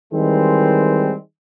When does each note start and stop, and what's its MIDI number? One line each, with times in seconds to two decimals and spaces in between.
0.13 1.15 51
0.13 1.15 52
0.13 1.15 55
0.13 1.15 56
0.13 1.15 60